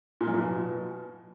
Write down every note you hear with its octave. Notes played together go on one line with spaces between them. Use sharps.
A#2
F#2
A#2
B2